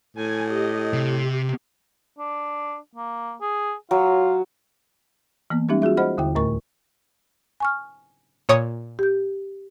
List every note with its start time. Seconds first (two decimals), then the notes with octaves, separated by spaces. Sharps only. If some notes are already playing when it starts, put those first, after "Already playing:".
0.17 A2 G#5
0.50 G4 D#5
0.93 C3 G4
2.19 D4
2.95 A#3
3.41 G#4
3.91 F#3 F4
5.50 E3 A#3 B3
5.69 G3 G#3 C#4 D#4 G4 E5
5.82 F4 F#4 G#4 E5
5.97 C5 D#5 F#5 B5 F6
6.17 D#2 D3 E4 G5
6.35 D2 A2 A3 A#4 C#6
7.60 G#5 C#6 F6
8.49 A#2 C#5 D#6
8.99 G4 G6